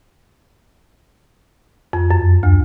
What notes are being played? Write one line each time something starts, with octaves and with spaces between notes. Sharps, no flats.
F2
F#2
D2